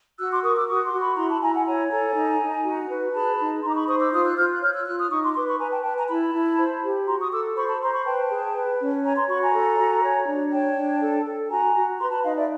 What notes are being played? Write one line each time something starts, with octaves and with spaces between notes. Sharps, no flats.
F#4 E6 F#6
C6 D6
A#4 C#6 D#6
D6 E6
F#4 C#6 D#6
C6 D6
F#4
B5 C#6
E4 A#5 C6
A5 B5
E4 G#5 A#5
F#5 G#5
C#5 G#5 A#5
A4 G#5 A#5
D#4
D#4
F#4
B4
G#4 A5 B5
D#4
D#4 A#5 C6
D6
B5 C#6
C5 C#6 D#6
D6 E6
F4 D#6 F6
E6 F#6
F4 F6 G6
F#6
C#5 F6 G6
E6 F#6
F4 E6 F#6
D#6 F6
D#4 C#6 D#6
C6 D6
B4 C6 D6
B5 C#6
B4 G#5 A#5
G5 A5
B4 G5 A5
G#5 A#5
E4 A5 B5
E4
C5
G4
F#4 A#5 C6
C#6 D#6
A4 D6 E6
C5 B5 C#6
A5 B5
C5 A#5 C6
B5 C#6
B4 G5 A5
G#4
B4
C#4
C#5 G#5 A#5
A#5 C6
F#4 B5 C#6
G#5 A#5
A4
F#4
C#5
D4
C#5 G5 A5
D4
A4
A4
F#4 G#5 A#5
F#4
B4 A#5 C6
A5 B5
D#4 D#5 F5
D5 E5